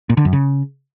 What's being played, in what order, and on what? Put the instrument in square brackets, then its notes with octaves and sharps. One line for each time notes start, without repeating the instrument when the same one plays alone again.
[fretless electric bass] A#2
D3
F#2
C#3